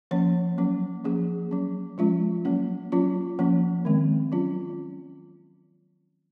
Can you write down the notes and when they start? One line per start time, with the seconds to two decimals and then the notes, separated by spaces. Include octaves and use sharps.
0.11 F3 A#3 C#4 C#5
0.58 F#3 A#3 C#4
1.04 F3 A#3 C#4 G#4
1.51 F#3 C#4
1.98 F3 G#3 C#4 F4
2.45 F#3 A#3 C#4
2.92 F#3 C#4 F4
3.39 F3 A#3 C#4
3.85 D#3 G#3 C4
4.32 F#3 C#4 F4